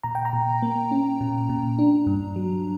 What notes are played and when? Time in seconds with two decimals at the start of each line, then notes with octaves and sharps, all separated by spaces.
0.04 A#2 A#5
0.15 G5
0.25 A#5
0.33 A#2
0.62 A#3
0.91 C#4
1.21 A#2
1.49 A#2
1.79 D4
2.07 G2
2.36 F#3